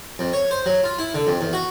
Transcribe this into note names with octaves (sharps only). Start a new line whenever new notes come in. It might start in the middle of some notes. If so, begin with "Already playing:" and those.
F2
C#5
C5
F#3
F4
E4
D3
F2
E2
F#4